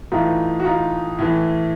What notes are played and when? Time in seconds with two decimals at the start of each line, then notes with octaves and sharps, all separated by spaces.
0.12 A2 E3 D#4 F4
0.60 F#4
0.65 D#4 F4
1.19 A2 E3